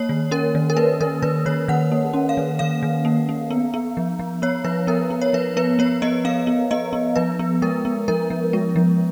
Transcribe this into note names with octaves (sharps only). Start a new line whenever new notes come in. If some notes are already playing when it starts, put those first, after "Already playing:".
Already playing: A#3 C#5
D#3
C#4 A#4
D#3
A#4
A#3 B4
D#3 A#4
D#3 B4
D#3 C#5
D#3 F#5
A#3
C#4
F5
D#3
D#3 F5
D#3
A#3
A#3
B3
B3
F3
F3
B3 C#5
F3 B4
B3 A#4
B3
C#5
F3 B4
B3 B4
B3 C#5
B3 D#5
B3 F5
B3
B3 D#5
B3
F3 B4
B3
G#3 A#4
B3
F3 A#4
F3
G#3
F3